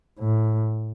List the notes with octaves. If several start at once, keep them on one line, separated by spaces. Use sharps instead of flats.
A2